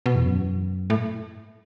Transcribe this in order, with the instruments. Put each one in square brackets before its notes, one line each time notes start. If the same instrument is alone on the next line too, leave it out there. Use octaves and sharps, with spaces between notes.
[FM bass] B2
E2
F#2
A2